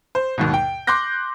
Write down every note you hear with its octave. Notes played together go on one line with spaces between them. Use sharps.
C5
D#2 G#2 B2
G5
C6 D6 F#6 G6 A#6